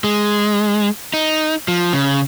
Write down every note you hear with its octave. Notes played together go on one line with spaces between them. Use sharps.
G#3
D#4
F3
C#3